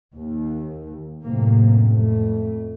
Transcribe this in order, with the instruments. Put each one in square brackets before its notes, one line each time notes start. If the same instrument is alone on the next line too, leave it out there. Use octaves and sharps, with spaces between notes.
[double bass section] D#2
F#2 A2 C3 A#3
F2 A3